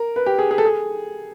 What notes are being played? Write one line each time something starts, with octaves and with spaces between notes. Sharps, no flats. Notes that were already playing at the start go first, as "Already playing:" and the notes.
Already playing: A#4
B4
G4
G#4
G#4
A4
G#4